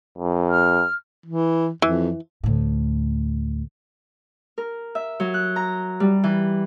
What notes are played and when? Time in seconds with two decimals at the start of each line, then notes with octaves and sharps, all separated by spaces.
0.18 F2
0.50 F6
1.26 E3
1.82 F2 E3
2.43 D2 A2
4.58 A#4
4.95 E5
5.20 F#3
5.34 F#6
5.56 A#5
6.00 G3
6.24 E3